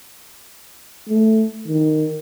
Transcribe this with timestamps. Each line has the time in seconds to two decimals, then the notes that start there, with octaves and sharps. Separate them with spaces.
1.09 A3
1.68 D#3